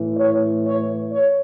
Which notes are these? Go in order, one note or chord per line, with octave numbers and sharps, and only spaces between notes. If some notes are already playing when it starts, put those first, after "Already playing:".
Already playing: A2 E3
C#5
C#5
C#5